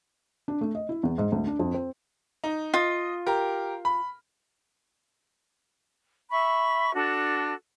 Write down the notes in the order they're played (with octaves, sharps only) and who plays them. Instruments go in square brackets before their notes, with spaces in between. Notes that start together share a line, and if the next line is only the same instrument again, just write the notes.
[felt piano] D4
A3
D#5
E4
E2
G#2
D2
D4
F2
C4
[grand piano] D#4
[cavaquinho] F4 [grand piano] D#5
[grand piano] G4 A#4
B5
[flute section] E5 B5 C#6
D4 F#4 A4